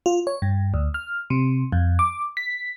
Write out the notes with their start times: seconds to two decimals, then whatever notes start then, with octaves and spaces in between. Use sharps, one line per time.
0.06 F4
0.27 C#5
0.42 G2
0.74 D2
0.94 F6
1.30 C3
1.72 F2
1.99 D6
2.37 B6